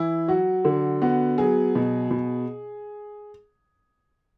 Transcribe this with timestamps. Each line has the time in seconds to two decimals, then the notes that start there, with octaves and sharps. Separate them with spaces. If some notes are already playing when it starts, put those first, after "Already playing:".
Already playing: E3 E4
0.28 F#3 F#4
0.65 D3
1.02 B3 F#4
1.38 F#3 G#4
1.75 B2
2.11 B2